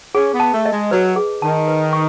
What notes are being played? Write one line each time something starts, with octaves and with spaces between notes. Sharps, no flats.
C#4 G#4
B3
A5
A3
D#5
G#3
F#3 B4
G#4
D#3 A5
B4
C#6